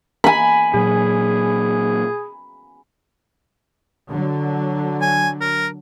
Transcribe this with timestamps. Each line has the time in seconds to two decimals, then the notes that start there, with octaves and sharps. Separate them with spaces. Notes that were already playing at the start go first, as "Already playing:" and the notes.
0.24 G#5 B5
0.74 A#2 F#3 G#4
4.09 D3 F#3
5.01 G#5
5.41 A#4